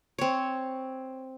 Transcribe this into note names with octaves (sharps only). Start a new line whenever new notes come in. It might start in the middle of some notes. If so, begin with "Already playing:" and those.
C4 C#5